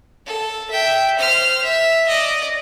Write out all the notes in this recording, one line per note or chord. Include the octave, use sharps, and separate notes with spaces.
A4
E5 G5
C5 F6
E5
D5 D#5